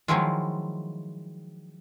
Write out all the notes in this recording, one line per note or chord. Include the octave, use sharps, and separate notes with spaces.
D#3 F3 F#3 G#3 E4 F4